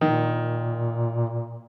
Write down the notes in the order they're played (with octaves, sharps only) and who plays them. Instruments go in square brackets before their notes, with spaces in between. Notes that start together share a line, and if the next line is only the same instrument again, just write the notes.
[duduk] A#2 [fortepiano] D#3